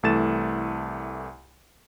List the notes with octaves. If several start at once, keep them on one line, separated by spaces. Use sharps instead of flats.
C2 E3 A3 A6 E7